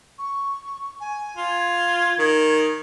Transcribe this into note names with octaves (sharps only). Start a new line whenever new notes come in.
C#6
G#5
F4
G#6
D#3